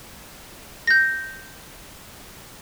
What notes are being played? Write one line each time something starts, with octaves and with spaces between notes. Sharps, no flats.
G6 A#6